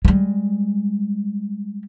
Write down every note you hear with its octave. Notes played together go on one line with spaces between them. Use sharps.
G3 G#3